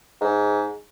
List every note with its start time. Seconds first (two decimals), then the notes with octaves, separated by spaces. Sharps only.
0.21 G#2